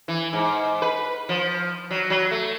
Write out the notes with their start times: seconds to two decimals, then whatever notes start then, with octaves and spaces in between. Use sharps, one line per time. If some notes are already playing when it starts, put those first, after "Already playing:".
0.08 E3
0.33 G#2
0.82 B4
1.29 F3
1.90 F#3
2.10 F#3
2.31 A3